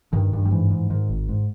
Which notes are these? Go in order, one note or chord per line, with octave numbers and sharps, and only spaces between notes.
G2 D#3
G2
G3
G#2 E3
G#2
G#2 D#3
G#1
G#2